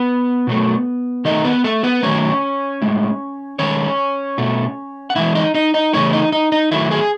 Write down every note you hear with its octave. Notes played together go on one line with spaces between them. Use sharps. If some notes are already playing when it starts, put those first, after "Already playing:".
Already playing: B3 B4
B2 F#3 A3
D#3 A3 D#4 D#5
B3 B4
A3 A4
B3 B4
D#3 F#3 A3 C#4 C#5
A2 G#3
D#3 G#3 C#4 C#5
B2 A3
F#5
A2 E3 G#3 E4 E5
D#4 D#5
D#4 D#5
D#4 D#5
C#3 E3 A3 C#4 C#5
D#4 D#5
D#4 D#5
D#4 D#5
D#3 F#3 A3 E4 E5
G#4 G#5